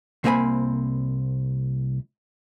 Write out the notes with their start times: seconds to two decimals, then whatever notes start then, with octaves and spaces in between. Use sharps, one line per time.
0.24 C2 A#3 C4 C#5 G#5 B5